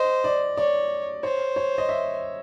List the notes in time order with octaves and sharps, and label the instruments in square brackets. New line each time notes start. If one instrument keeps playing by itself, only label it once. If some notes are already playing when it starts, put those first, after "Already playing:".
Already playing: [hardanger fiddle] C5 [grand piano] D#5
[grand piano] D5
[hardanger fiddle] C#5 [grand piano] D5
[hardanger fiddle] C5 [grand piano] C#5
[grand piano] C#5
D#5
E5